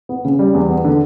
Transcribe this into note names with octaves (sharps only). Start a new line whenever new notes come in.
B3
C#3
G3
E2
B3
D3